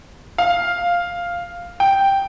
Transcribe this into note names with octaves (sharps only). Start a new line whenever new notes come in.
F5
G5